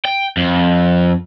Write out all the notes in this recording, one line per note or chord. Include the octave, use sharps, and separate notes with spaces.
G5
F2